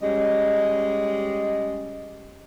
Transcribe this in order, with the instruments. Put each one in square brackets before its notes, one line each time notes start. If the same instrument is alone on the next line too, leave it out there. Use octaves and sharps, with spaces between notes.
[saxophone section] G3 G#3 C#4 D#5